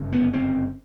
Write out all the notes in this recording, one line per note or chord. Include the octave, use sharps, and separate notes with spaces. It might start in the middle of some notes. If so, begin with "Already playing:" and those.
Already playing: G1 F#2 C#3
B3
C4